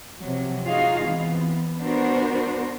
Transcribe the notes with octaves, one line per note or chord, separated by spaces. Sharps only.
C3 F3 F#3
D#4 F4 F#4 G#4 F5
E3 B3 C4
B3 D4 F#4 A#4 C5